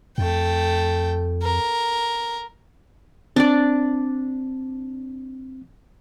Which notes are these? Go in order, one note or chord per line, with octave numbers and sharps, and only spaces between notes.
F2 A3 G5
A#4
C4 D4 D5